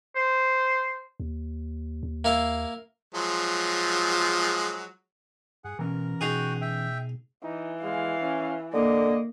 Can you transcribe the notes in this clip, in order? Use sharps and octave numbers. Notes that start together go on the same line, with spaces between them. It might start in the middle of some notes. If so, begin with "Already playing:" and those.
C5
D#2
D#2
A#3 E4 F5
F3 F#3 G#3
G2 G#4 F#5
B2 E3 C4 C#4 A#4
B2 D#4 F#4 G#4 G5 F#6
E5 G5
E3 D#4
G#3 F5
C#4
D3 A#3 D#5